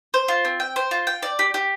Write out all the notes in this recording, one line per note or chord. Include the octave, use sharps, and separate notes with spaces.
C5
F4
C4
G5
C5
F4
G5
D5
G4
G4